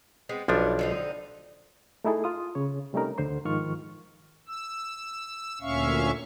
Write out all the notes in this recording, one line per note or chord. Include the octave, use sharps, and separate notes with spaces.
G#3 B3 C4
B1 E3 F3 G3 B3 D4
D3 C4 D#4
A3 D#4 E4 G#4 A4
F4 D#6
C#3 C#5
C3 G3 A3 C#4 D#4 A#4
D2 D3 C5 C6
G#2 D#3 F3 F4 C#6 F6
E6
D2 A#2 C#4 E5 F5 C#6